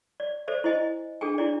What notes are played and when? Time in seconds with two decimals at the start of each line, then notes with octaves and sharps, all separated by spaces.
0.20 D5
0.48 A4 C5 D5 E5
0.64 E4 C5 D#5 G#5
1.21 D4 G#4 A4 G5 G#5
1.38 D4 E4 D5